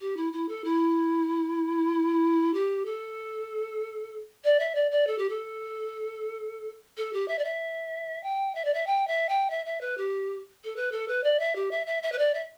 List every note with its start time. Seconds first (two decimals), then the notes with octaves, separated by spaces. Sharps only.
0.01 G4
0.17 E4
0.33 E4
0.49 A4
0.64 E4
2.54 G4
2.85 A4
4.44 D5
4.60 E5
4.75 D5
4.91 D5
5.07 A4
5.18 G4
5.30 A4
6.97 A4
7.13 G4
7.28 E5
7.39 D5
7.44 E5
8.23 G5
8.55 E5
8.65 D5
8.74 E5
8.87 G5
9.08 E5
9.29 G5
9.50 E5
9.66 E5
9.81 B4
9.98 G4
10.64 A4
10.76 B4
10.92 A4
11.08 B4
11.24 D5
11.40 E5
11.56 G4
11.71 E5
11.87 E5
12.03 E5
12.12 B4
12.18 D5
12.34 E5